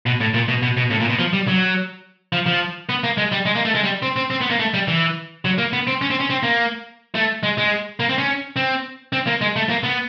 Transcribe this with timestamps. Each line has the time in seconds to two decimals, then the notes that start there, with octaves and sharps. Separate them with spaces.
0.06 B2
0.20 A2
0.34 A#2
0.48 B2
0.62 B2
0.77 B2
0.91 A2
1.00 A#2
1.09 B2
1.19 F3
1.33 G3
1.48 F#3
2.33 F3
2.46 F3
2.89 B3
3.04 A#3
3.17 G#3
3.32 G3
3.46 G#3
3.55 A#3
3.65 A3
3.75 G#3
3.84 G3
4.02 C4
4.16 C4
4.30 C4
4.41 B3
4.50 A#3
4.59 A3
4.74 G3
4.88 E3
5.45 F#3
5.58 A#3
5.73 B3
5.87 C4
6.01 C#4
6.10 C4
6.20 C#4
6.30 C4
6.43 A#3
7.15 A3
7.43 G#3
7.58 G#3
8.00 A#3
8.09 C4
8.18 C#4
8.56 C4
9.13 C4
9.27 A#3
9.41 G#3
9.56 A3
9.69 A#3
9.83 B3